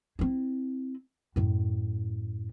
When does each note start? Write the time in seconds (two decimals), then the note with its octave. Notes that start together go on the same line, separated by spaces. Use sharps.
0.19 C4 E4
1.36 F#2 A2